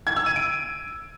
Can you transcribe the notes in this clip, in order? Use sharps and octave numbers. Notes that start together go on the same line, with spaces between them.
G#6
E6
D#7
D7